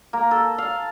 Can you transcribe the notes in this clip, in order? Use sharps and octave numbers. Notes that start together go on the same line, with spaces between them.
A#3
A4
F5